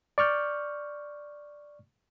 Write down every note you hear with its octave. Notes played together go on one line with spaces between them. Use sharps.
D5 C#6 F6 G6